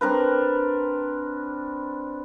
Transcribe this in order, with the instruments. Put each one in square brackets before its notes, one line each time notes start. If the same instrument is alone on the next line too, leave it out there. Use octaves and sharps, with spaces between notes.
[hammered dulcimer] C4 D4 A#4 B4